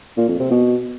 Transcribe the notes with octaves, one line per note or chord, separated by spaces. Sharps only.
A#2
F2
C3
B2